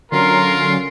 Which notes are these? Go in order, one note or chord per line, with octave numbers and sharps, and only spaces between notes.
D3 F#3 C#4 F4 A#4 C6